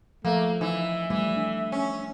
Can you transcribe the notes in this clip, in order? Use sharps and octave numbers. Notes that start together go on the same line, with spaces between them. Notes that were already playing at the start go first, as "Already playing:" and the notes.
F3 A3 A#3
E3 D#4 E5
E3 G3 A3
D4
C#4